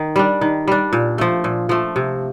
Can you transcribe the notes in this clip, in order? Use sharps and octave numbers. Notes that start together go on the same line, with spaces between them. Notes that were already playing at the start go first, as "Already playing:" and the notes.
Already playing: D#3
G3 D4
D#3
G3 D4
A#2
F3 A3
A#2
F3 A3
C3